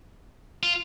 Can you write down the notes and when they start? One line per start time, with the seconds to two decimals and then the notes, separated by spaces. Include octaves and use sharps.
0.63 F4